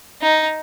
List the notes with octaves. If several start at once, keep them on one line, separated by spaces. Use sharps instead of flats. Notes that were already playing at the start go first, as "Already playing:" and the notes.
D#4